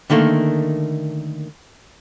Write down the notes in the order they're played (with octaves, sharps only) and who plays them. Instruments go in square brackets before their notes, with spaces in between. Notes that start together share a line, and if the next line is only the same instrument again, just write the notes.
[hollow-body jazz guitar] D3 D#3 A3 A#3